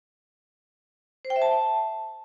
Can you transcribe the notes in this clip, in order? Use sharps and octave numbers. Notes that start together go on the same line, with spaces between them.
C5
G5
E5
A5